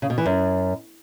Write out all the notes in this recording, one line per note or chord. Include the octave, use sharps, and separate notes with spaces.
C#3
B2
E3
F#2